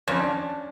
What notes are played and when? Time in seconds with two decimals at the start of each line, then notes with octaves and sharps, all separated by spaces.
0.08 F2 C#4
0.19 D4